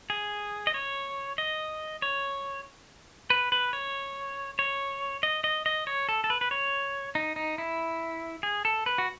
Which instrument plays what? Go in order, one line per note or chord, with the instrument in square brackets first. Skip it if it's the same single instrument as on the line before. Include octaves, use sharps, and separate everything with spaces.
[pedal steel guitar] G#4
D#5
C#5
D#5
C#5
B4
B4
C#5
C#5
D#5
D#5
D#5
C#5
A4
A4
B4
B4
C#5
D#4
D#4
E4
G#4
A4
B4
F#4